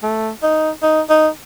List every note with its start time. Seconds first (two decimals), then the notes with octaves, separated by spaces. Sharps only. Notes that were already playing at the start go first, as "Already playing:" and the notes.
0.03 A3
0.43 D#4
0.82 D#4
1.10 D#4